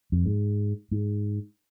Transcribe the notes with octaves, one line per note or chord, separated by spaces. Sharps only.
F2
G#2
G#2